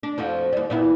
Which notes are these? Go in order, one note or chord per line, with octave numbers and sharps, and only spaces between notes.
D4
F2 F3 F#4
D#2 G3
A#2 B3 E4